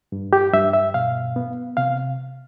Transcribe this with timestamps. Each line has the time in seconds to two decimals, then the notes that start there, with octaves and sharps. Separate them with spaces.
0.12 G2
0.33 G4
0.53 G2 E5
0.73 E5
0.94 B2 F5
1.36 B3
1.77 C3 F5